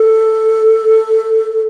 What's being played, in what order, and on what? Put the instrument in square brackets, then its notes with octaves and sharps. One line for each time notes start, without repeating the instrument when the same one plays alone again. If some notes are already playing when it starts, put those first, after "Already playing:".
Already playing: [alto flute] A4